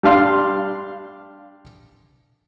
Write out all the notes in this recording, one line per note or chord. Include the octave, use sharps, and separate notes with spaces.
G3 D4 F5 C6